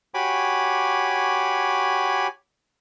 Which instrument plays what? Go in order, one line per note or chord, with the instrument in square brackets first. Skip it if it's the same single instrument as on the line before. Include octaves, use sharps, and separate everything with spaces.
[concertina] F#4 G4 C#5 G#5 B5 D6